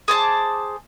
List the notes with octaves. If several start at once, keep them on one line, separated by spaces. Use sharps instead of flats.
G#4 C5 A5 D6